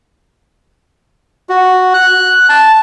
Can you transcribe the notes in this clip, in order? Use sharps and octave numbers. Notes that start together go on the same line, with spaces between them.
F#4
F#6
A5